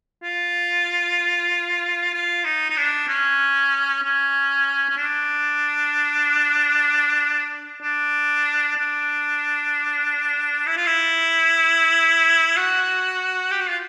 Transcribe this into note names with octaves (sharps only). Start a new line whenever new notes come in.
F4
F4
D#4
D#4
D4
C#4
C#4
C#4
D4
D4
D4
E4
F4
E4
F#4
G4
F#4
F4